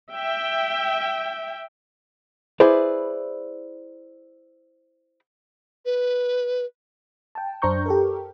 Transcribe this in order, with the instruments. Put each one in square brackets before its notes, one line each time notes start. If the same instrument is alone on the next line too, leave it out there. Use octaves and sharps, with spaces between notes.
[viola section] E5 G5
[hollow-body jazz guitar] E4 G#4 B4 C5 D5
[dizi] B4
[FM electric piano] G5 A5
F#2 D4 C5 A#5 C#6 G6
G4 A4 A#4